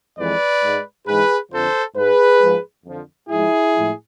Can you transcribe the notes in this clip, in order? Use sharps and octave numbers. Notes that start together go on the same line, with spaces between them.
F2 E3 G#3 B4 D5
G#2 G#3
G#2 E3 G#3 G#4 B4
F2 D3 F3 A4 C5
G#2 G#3 G#4 B4
G#2 F3 G#3
F2 D3 F3
G#2 F3 G#3 E4 G#4
A2 F3 G#3